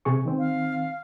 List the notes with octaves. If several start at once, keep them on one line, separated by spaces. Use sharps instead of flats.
C3 G#4 C#6
D#3 C4
F5